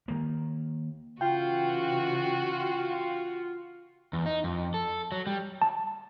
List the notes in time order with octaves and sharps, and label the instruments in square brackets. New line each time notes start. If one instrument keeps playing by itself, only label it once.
[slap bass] D#3 A#3
[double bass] C#3 E3 [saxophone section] F4 [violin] F#4 [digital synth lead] G5
[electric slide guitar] E2
D#4
F2
A4
F#3
G3
[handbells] A5